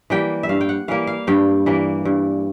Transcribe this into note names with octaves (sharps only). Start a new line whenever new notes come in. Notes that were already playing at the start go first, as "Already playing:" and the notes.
E3 G3 A#3 G5
E5
G2 F5
G5
F#5
E3 G3 A#3 F5
F5
G2 G5
E3 G3 A#3
G2